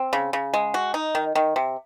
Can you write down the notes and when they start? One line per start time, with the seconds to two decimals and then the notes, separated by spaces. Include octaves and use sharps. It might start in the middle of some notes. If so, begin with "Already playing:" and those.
Already playing: C4
0.13 C#3
0.33 C#3
0.53 G#3
0.74 F#4
0.94 D#4
1.15 D#3
1.35 D#3
1.56 C3